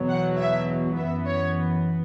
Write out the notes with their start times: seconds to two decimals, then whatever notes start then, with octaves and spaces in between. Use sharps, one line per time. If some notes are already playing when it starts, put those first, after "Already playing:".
Already playing: E2 B2 F#3
0.11 F#5
0.39 E5
0.97 F#2 E3 B3 E5
1.26 C#5